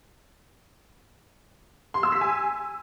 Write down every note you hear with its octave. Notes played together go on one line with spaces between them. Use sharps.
C6
E6
B6
G#5